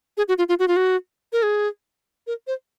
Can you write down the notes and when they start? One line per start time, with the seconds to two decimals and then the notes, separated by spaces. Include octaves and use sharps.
0.17 G#4
0.28 F#4
0.38 F4
0.49 F4
0.59 F#4
0.68 F4
0.76 F#4
1.33 A#4
1.43 G#4
2.27 A#4
2.47 C5